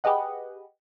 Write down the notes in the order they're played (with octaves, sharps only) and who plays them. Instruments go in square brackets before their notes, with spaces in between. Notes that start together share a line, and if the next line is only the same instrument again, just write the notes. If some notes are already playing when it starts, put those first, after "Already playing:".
[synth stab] G4 G#4 B4 D#5 F#5